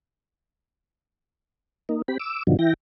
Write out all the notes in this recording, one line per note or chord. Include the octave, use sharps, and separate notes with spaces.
A#3 D#4
C4 G4 B5
D6 E6
G2 B2 D3 D#3 F3 F#3
E3 E4 G5 A#6